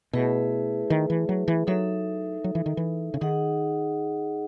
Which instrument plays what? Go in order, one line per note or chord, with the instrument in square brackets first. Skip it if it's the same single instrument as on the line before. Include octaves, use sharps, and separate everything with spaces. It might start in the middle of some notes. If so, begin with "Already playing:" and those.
[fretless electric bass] B2 [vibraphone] A3 E4 G#4 B4 E5
[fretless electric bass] D#3
E3
F#3
E3
[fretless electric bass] F#3 [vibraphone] D#4 A4 E5
[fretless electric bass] F#3
E3
D#3
E3
C#3
[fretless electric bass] D#3 [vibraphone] D#4 G#4 D#5 F#5